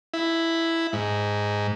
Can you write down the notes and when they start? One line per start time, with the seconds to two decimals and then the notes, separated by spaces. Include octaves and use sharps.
0.14 E4
0.93 G#2